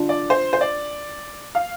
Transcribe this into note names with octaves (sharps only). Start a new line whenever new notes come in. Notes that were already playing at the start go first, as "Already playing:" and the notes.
Already playing: D4 F4
D5
C5
C5
D5
F5